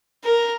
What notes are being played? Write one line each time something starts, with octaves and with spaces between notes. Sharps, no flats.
A#4